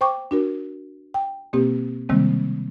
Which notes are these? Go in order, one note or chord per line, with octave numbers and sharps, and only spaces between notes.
C5 G5 C#6 D6
D4 F#4 A#4
G5
B2 A#3 C4 G4
C3 D#3 G3 G#3 A#3 C4